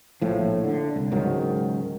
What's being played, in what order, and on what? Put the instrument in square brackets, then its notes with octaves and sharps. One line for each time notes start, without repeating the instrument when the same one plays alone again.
[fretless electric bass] A#1 A2 F3
D3
C2
C#2 G#2 D#3 F#3